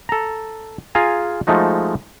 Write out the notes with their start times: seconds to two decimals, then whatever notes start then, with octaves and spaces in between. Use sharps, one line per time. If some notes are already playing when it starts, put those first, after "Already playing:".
0.09 A4 A#5
0.95 F4 G#4 F5 G#5 A#5
1.47 F3 G#3 A3 D#4 F#4